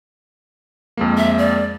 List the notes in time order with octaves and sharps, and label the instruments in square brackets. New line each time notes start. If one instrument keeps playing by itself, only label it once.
[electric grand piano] F2 G#3 A#3
[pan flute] E5
D5